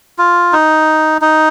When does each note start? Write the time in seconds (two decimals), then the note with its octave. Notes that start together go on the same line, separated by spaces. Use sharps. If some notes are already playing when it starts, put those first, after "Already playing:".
0.18 F4
0.53 D#4
1.22 D#4